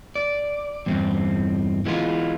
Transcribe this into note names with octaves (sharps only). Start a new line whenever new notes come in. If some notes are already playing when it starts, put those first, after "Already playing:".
D5
E2 G2 C4
E3 G#3 B3 F4